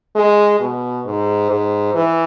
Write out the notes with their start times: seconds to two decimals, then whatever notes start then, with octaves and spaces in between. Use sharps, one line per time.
0.16 G#3
0.60 B2
1.05 G#2
1.50 G#2
1.95 E3